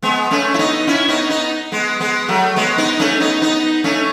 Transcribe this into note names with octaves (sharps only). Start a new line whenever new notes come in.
G#3 B3
A3 C#4
E4
B3 D#4
C#4 E4
B3 D#4
B3 D#4
G#3 B3
G#3 B3
F#3 A3
G#3 B3
B3 D#4
A3 C#4
B3 D#4
B3 D#4
A3 C#4